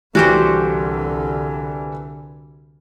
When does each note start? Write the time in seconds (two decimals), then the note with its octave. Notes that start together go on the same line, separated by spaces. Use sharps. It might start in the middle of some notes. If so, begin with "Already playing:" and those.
0.15 C2 D3 E3 G3 F#4 G4 C5